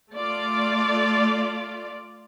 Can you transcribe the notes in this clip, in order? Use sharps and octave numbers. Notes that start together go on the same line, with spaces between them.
A3 F4 D5